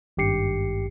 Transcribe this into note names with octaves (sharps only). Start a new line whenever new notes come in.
G#1 G2 G4 C7 C#7